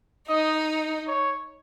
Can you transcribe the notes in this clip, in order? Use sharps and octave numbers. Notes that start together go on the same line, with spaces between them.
D#4 D#5
C#5